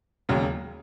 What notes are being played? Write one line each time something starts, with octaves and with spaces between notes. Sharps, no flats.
E1 D#2 C#3 F#3